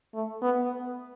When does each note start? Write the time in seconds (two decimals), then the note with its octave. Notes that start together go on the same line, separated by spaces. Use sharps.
0.14 A3
0.42 B3